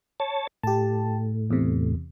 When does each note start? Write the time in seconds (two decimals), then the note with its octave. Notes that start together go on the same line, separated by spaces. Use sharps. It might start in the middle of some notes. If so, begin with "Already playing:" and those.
0.20 C#5 A5
0.63 A2 G4 A5
1.50 E2 C3